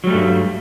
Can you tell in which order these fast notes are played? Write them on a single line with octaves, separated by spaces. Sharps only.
F#3 G3 A3 G2